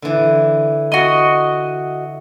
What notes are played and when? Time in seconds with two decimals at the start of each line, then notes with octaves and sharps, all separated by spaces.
0.02 D3 E3
0.92 F#4 D#5